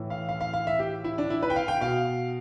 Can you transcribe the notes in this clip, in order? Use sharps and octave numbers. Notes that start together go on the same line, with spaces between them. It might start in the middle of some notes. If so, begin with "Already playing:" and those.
Already playing: A2 E3
F5
F5
F5
F5
E5
G4
E4
D4
E4
B4
G5
F5
G5
B2 F5